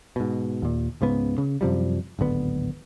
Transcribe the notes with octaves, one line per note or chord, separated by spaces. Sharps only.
G#2 B2
D#2 A#2
C#2 G#2 C#3 B3
C#3
F#2 C3 F3 G3
D1 G#1 D3 B3